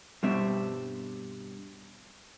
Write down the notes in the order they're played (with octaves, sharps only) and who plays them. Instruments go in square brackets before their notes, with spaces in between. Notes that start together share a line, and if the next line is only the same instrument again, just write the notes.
[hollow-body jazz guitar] G2 B2 G3 C4 E5